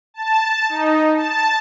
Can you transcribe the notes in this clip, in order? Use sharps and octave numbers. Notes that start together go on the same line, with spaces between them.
A5
D#4
A5